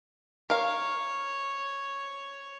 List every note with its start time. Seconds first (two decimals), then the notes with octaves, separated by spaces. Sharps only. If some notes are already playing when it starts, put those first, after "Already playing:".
0.50 A#4 C#5 F5